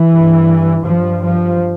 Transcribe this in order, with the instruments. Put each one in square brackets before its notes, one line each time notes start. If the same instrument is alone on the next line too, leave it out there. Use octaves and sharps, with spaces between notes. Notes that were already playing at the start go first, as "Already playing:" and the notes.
Already playing: [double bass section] E3
G2
G2 F3
F3